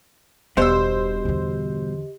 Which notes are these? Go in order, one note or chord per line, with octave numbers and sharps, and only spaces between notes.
E1 G2 B2 G4 C5 D#5 C6 E6
E2 D3